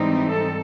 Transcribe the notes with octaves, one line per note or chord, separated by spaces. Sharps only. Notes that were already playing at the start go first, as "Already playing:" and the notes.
Already playing: G#2 E3 G3 C4 D#4
A4